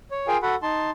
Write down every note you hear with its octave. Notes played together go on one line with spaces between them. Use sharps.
C#5
F4 G#4 A#4 F5 G5 G#5
F#4 A4 F#5 B5
D#4 A5 C6